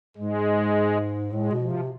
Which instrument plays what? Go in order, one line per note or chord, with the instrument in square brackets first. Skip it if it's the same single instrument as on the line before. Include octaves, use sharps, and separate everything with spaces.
[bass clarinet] G#2 [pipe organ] G#3
[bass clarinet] A2 [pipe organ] G#3
[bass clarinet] B2
[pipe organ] F3
[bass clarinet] C3